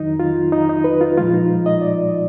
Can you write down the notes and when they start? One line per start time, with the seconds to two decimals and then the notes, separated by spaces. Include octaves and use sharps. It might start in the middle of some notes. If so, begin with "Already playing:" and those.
Already playing: F2 D#3 F#3 D#4
0.19 F4
0.52 D#4
0.69 D#4
0.84 B4
1.01 F4
1.17 A#2 F3 G#3 F4
1.34 D#4
1.66 D#5
1.82 D5